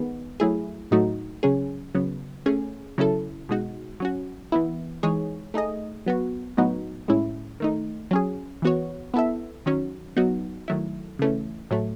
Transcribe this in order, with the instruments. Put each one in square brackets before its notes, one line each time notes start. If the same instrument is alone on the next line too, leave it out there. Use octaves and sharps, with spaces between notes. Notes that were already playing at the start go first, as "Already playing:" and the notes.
Already playing: [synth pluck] D#3 G#3 B3
F#3 A3 E4 G#4
A2 F#3 A3 D#4 F#4
C#3 F#3 C#4 G#4
C#3 F#3 B3
A3 C#4 G#4
C#3 F#3 C#4 E4 A4
B2 G#3 D#4 F#4
F#3 C#4 F#4
E3 B3 E4
E3 G#3 D#4 G#4 C#5
A3 D#4 G#4 D#5
F#3 B3 F#4
A2 F#3 B3 D#4 F#4
A2 G#3 C#4 E4
D#3 A3 D#4
F#3 C#4 G#4
E3 B3 F#4 C#5
B3 E4 A4 E5
D#3 F#3 C#4
F#3 B3 D#4 F#4
D#3 F#3 A3 E4
C#3 E3 A3 C#4
A2 F#3 A3